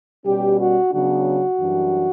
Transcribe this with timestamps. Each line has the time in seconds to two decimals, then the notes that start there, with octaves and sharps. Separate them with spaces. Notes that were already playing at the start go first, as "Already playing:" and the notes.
0.25 B2 G3 C#4 G4
0.58 F#4
0.91 C#3 F#3 B3 D4 F#4
1.57 F#2 E3 G3 D4